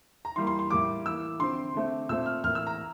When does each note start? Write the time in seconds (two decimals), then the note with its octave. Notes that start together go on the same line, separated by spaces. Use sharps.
0.25 A#5
0.36 E3 G3 A#3 C6
0.47 C6
0.59 C6
0.71 A2 G3 A#3 D6
1.06 E3 A#3 E6
1.39 D3 F3 C4 C6
1.74 D3 A3 C4
2.09 A#2 A3 C4 E6
2.26 F6
2.44 A2 E3 A#3 F6
2.55 E6
2.67 A#5